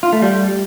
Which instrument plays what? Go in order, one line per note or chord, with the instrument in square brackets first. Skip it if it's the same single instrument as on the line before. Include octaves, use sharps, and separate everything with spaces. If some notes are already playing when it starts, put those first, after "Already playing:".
[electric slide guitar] F4
A3
G3